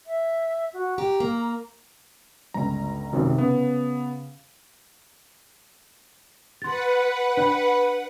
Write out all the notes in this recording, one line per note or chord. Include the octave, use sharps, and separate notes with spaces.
E5
F#4
G4 A#5
A#3
G1 C#2 A#5
G#1 F#2 C3 D#3
C#3 B3
B4 F#5 C6 A6
D4 D5 B5